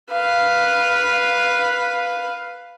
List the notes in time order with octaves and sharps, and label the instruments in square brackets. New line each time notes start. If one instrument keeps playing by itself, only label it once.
[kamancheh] B4 F5